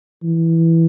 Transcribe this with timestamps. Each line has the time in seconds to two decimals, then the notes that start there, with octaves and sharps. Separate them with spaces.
0.24 E3